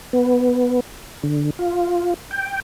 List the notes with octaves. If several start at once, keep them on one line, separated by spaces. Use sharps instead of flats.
B3
D3
F4
G5